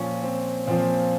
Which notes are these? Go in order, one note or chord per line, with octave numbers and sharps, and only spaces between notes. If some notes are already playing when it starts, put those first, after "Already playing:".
Already playing: A#2 F3 C#4
C4
A#2 F3 C4